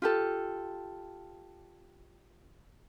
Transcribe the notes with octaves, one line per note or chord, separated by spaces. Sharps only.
F4 G4 A4